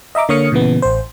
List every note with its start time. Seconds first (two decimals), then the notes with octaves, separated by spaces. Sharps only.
0.15 D#5 E5 A#5 D6
0.29 D3 A#3 C#5 D#6 F6 C#7
0.52 A#2 C#3 E3 B3
0.82 A1 C5